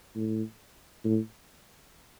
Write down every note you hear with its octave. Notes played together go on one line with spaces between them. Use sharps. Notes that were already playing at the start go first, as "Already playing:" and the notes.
A2
A2